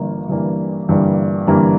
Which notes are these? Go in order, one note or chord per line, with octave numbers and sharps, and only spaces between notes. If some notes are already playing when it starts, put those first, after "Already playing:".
Already playing: G1 G2 E3 G3 A#3
G1 G2 E3 G3 A#3
G1 G2 E3 G3 A#3
G1 G2 E3 G3 A#3